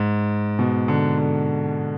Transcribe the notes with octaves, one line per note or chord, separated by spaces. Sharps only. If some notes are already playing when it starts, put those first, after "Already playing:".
Already playing: G#2
B2
D3
D3